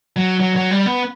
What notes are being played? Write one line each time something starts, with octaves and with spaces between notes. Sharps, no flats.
F#3
F#3
F#3
G3
B3